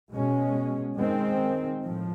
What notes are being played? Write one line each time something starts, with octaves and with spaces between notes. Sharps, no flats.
B2 G#3 C#4
D#3 G#3 C4
A2 F3